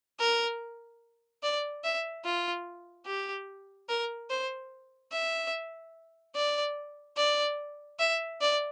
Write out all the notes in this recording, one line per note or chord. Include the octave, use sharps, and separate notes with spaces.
A#4
D5
E5
F4
G4
A#4
C5
E5
D5
D5
E5
D5